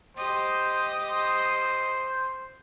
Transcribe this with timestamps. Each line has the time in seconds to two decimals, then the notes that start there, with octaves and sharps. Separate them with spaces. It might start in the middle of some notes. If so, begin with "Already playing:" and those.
0.17 G4 C5 D#5
1.07 C5